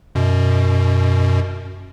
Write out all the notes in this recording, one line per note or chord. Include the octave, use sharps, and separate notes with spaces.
F#2 B2